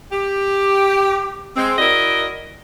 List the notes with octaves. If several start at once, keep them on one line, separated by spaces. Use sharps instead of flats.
G4
G#3 C4
E4 F#4 A#4 D5 D#5